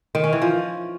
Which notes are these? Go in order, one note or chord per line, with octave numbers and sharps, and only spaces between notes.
D#3
C#4
E3
F3